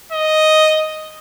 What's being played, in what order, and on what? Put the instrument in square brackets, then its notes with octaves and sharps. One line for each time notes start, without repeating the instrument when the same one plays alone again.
[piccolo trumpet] D#5